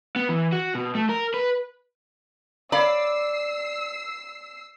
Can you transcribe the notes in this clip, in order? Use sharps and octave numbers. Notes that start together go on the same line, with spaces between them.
B3
E3
F#4
B2
A3
A#4
B4
C#5 D5 F5 B5 E6 C7